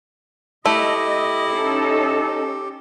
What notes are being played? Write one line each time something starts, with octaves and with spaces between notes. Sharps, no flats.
A3 E4 G4 D#5
C#4 D#4 A4